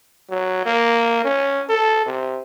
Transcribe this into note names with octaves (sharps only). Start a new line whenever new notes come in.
F#3
A#3
C#4
A4
C3